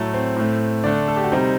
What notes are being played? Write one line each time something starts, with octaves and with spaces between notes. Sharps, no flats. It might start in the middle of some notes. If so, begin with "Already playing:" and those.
Already playing: A2 F#3 A3
C4
A2 A3
D3 A3 D4
A4
G4
F#4
C3 G3 C4 D#4